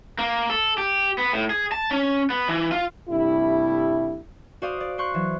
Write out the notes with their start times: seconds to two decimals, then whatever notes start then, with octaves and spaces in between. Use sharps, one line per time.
0.19 A#3
0.50 A4
0.78 G4
1.18 B3
1.33 A2
1.50 G#4
1.72 A5
1.91 C#4
2.30 B3
2.49 E3
2.72 F4
3.09 G2 C3 G3 A3 E4
4.62 F#4 C5 D5 F5 D#6
4.80 D5
4.98 C5 C6 C#6 F#6
5.14 E3 F#3